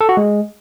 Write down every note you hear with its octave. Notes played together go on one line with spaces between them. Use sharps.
A4
F#4
G#3